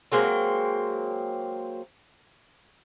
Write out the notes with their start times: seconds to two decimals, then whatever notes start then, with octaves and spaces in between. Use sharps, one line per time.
0.12 F#3 G#3 A#3 C4